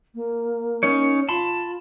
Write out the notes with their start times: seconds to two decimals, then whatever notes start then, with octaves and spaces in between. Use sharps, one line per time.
0.14 A#3
0.83 C#4 D#4 C#5
1.29 F4 A5 B5 C6